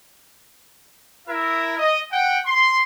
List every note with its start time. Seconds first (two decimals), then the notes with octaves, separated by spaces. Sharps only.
1.28 E4 A#4 E5
1.78 D#5
2.11 F#5 G5
2.46 C6